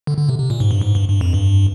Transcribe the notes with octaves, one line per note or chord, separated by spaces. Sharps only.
D3
D3
C3
C3
A#2
G#2
G2
G#2
G2
G2
F2
G2